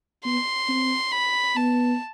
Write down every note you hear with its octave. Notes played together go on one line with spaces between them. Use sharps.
B3 C6
C4
B5
B3 A5